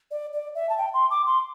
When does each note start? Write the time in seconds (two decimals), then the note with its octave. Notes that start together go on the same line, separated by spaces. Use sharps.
0.11 D5
0.33 D5
0.55 E5
0.69 A5
0.78 G5
0.94 C6
1.10 D6
1.26 C6